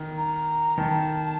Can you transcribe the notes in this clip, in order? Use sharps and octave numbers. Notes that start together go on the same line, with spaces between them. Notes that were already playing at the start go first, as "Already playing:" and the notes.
Already playing: D#3
A#5
D#3 A5